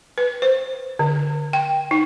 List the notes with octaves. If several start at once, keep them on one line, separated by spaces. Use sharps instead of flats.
B4
C5
D3
G5
D#4